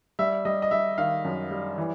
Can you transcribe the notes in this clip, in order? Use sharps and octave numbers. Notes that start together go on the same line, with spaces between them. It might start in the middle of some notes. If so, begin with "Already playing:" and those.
G3 E5
G3 D#5
D#5
G3 E5
D#3 F5
F#2
G3
E3